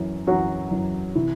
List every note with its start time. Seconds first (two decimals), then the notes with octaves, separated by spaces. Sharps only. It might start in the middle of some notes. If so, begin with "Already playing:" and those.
Already playing: F#2 E3
0.27 F#2 E3 F#3 F#4
0.71 F#2 E3
1.15 C3 E3 E4